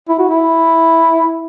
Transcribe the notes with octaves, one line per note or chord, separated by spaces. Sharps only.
E4
F#4
E4